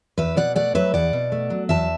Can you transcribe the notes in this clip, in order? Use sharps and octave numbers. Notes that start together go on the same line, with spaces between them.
E2 B4 E5
B2 D5 F#5
A3 D5 F#5
F#3 B4 E5
E2 D5 F#5
B2
A3
F#3
E2 E5 A5